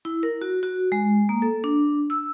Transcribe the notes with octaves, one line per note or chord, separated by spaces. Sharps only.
E4
A#4
F#4
F#4
G#3
A#3
A4
D4
E6